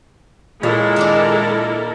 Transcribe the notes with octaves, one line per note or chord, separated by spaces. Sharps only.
A#2 G#3 E4 A4 A#4 C#5
D#3 A#3 D4